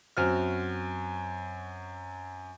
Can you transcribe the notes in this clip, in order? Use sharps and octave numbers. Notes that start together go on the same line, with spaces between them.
F#2 C4 F#4 F6